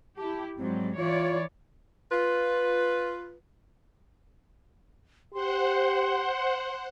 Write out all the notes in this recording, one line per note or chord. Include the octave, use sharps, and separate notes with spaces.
E4 G4 A5
G#2 F#3 G3 C4
E3 F4 C#5 D5
F4 B4
G4 C5 F#5 C6